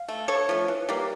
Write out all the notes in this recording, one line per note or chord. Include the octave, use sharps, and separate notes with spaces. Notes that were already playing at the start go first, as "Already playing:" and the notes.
Already playing: F5
A3
D3 A4 C#5
F3 A3
E3
G3 A#3